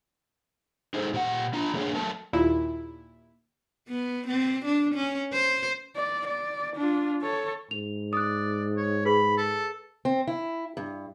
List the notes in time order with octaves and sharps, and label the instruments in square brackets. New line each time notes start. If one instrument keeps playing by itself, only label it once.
[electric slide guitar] D#4 G#4 A4 C5
A#2 G4 A#4 F#5
D4 F4 A#5
F#3 A3 A#3 D4 G#4 C#5
F#3 A3 A#4 A5
[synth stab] D#2 A#2 E4
[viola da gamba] B3
C4
D4
C#4
C5
[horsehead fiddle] D5
D5
D4 F4
A4 C#5
[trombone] G#2 [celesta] F7
[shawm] D5 [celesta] D#6 F#6
[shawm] C#5
[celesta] G#4 B4 [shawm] B5
[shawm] A4
[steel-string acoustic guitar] C4
E4
G2